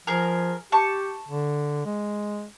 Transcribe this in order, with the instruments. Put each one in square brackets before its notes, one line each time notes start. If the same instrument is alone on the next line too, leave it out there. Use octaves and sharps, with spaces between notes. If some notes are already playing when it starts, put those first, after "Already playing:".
[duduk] F3 [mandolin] G#4 A#4
[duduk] G4 [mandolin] A5 C#6
[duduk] D3
G#3